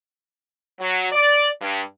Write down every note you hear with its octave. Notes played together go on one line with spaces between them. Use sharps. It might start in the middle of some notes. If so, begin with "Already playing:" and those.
F#3
D5
G2